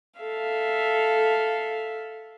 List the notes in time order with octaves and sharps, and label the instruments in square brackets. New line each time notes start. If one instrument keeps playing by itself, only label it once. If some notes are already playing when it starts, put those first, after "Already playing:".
[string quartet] A4 E5 F5